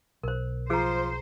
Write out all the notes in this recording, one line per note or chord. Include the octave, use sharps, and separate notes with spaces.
B1 A#4 C5
F3 G#4 C5 A#5